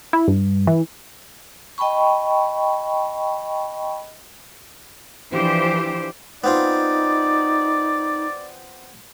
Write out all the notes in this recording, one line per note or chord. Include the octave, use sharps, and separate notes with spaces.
E4
G2
E3
D#5 G5 A5 B5 C#6
E3 F3 D4 G4 C5
B3 C4 D#4 F4 D5